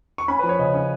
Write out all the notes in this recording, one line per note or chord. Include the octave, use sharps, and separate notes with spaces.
C#6
C#4 B5
F3 B4
C#5
C#3 D#5
C#4